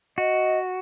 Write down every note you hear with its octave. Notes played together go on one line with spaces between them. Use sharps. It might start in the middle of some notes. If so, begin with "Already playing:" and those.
F#4 D#5